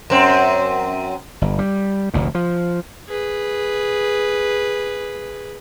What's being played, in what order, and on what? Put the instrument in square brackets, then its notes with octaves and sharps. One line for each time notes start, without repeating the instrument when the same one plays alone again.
[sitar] F#2 C4
[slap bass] G1
G3
F1 D2 A#2
F3
[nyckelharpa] G#4 B4